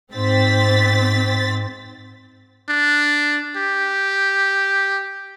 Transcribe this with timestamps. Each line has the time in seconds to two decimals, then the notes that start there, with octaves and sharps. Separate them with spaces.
0.13 G#2 C4 A6 B6
2.69 D4
3.57 G4